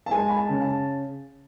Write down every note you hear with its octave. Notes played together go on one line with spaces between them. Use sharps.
A5
G#3 G#5
B5
A5
C#3
A5